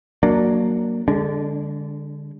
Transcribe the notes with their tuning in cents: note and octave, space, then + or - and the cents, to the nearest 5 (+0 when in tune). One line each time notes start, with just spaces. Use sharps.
F#3 +0 A#3 +0 D4 +0
D3 +0 G#3 -30 D4 -30